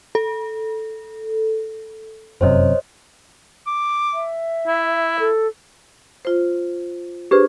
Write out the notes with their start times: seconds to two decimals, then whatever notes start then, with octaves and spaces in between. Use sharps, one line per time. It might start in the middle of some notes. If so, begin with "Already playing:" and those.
0.15 A4
2.41 F1 F#2 C3 C5 C#5 D#5
3.67 D6
4.14 E5
4.67 E4
5.20 A4
6.25 F4 C5
7.31 D4 G4 G#4 B4 C5